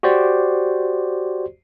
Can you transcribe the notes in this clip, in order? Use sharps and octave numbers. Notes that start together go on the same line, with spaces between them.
F#4 G4 C5 D5